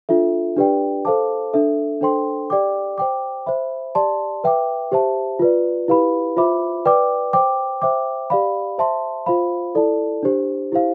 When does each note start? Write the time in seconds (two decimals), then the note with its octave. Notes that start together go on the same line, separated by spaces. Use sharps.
0.09 D4 F4 A4 E5
0.56 D4 G4 B4 D5 G5
1.05 A4 C5 F5 A5 D6
1.53 D4 A4 E5
2.01 D4 A4 C5 G5 C6
2.50 G4 D5 G5 D6
2.98 C5 G5 D6
3.46 C5 E5 B5
3.95 G4 D5 A5 C6
4.44 B4 E5 G5 D6
4.92 G4 C5 E5 A5
5.39 F4 B4 D5
5.88 E4 G4 B4 F5 B5
6.37 F4 C5 E5 B5 D6
6.86 B4 D5 G5 D6
7.33 C5 G5 D6
7.82 C5 E5 G5 D6
8.30 G4 D5 F5 B5
8.78 C5 E5 A5 C6
9.26 F4 C5 F5 B5
9.75 E4 A4 D5 A5
10.23 D4 G4 C5
10.72 E4 G4 C5 F5